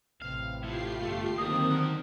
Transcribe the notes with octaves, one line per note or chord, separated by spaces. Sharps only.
A1 C3 F5
A3 E4 F4 G4 C7
G1 A3
D3 D#3 F#3 A#3 C4 G4 D#6
A#4 F#5